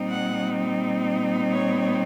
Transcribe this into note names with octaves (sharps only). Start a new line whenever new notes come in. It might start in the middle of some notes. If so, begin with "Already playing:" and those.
Already playing: A#2 G3 C4 D#4
F#5
C#5